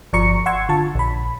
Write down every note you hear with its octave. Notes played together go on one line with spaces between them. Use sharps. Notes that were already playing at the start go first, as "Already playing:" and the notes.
G1 F3 D5 A#5 C#6 C#7
F#5 C6 C#6 E6 G#6
D3 F4 A5
A#1 B5